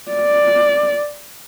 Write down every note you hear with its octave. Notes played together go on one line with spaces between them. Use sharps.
D5